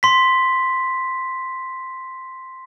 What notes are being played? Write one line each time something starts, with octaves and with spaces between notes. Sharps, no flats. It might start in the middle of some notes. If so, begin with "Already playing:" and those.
C6 B6